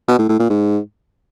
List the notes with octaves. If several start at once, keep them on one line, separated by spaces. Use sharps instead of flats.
B2
A2
A2
A#2
G#2